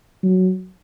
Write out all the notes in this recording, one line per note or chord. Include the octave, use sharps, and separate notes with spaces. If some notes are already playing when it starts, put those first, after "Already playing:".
F#3